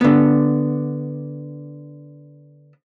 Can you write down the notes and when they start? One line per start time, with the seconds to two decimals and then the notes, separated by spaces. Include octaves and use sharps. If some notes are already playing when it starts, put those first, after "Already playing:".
0.01 D3 B3